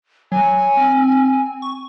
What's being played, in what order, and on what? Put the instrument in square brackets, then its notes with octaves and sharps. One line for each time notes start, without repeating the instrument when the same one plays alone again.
[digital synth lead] F#3 [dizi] G#5
[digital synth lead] C4
C#6